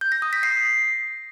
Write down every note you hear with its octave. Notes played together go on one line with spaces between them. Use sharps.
G6
A#6
D#6
B6
C7